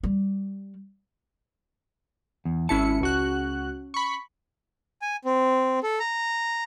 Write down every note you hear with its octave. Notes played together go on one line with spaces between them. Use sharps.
G3
E2
G#1 C#4 E4 A5 C#7
C#2 F#4 F#6
B5 C#6
G#5
C4
A4
A#5